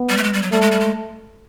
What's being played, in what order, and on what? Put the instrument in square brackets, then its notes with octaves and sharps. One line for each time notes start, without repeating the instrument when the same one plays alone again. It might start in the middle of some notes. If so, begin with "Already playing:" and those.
Already playing: [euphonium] B3
[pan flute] G3
A3
G#3
G3
F#3
[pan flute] G3 [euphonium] A3
[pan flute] G#3
G3
G#3